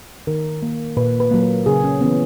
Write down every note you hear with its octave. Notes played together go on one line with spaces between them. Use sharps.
D#3 A#4
A#3
A#2 B4
B4
F#3 A#3
A#4
C#3 G#4
C#4
E3 B3 C#4